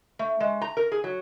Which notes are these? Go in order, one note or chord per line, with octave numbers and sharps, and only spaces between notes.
A3
G#3
A#5
A#4
G#4
F#3